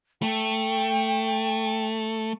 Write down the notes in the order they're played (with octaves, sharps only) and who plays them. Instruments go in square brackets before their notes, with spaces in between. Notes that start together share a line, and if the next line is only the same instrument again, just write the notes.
[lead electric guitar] A3 [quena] G5